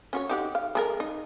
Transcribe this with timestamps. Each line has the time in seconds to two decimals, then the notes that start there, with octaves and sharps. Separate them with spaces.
0.13 C#4 F#4 C#5
0.29 D#4 G4 F#5
0.55 F5
0.75 G#3 G#4 A#4
1.00 D#4